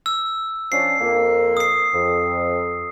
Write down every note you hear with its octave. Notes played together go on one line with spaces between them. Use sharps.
E6
F3 C#4 D4 C7
F2 A#3
D#6 C7
F2